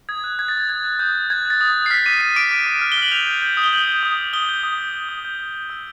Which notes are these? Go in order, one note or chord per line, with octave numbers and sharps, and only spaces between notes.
D#6 G#6
F#6
D#6 G#6
A6
F#6 G#6
F#6 G#6
F#6
D#6 G6
F#6
F#6 G#6
F#6
A6
D#6
D#6
C7
F6 B6
D6 D#7
F6 D#7
D6 D7
D6
D6
F6
G7
F6 F#7
G6 F7
G6
G6
D#6
G7
G6 F#7
G6
D#6
G6
D#6 G7
G6
D#6
G6
G6
D#6
G6
G6
G6
E6